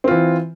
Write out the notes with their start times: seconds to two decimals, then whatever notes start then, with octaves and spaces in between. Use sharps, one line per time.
0.04 C4
0.08 F4
0.11 E3